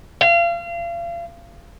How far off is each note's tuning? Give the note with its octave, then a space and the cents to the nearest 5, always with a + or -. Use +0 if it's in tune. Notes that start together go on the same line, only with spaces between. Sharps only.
F5 -35